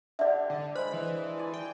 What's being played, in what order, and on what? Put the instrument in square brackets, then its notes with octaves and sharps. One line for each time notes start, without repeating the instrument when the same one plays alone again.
[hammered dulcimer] D3 G4 G5 [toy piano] D5 E5
[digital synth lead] D3 [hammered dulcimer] D4
[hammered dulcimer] G#3 [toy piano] C5 [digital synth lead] B5
[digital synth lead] E3
[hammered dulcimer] D5 G#5 A5
[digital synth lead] G5